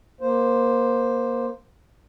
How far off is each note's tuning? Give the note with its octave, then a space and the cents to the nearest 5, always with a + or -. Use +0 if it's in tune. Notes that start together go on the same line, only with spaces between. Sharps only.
A#3 +15 C5 +0